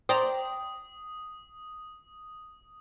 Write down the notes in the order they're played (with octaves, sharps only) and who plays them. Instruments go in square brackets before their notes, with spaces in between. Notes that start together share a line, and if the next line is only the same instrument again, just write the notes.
[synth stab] C5 D5 A#5 [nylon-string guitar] G5 [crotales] D#6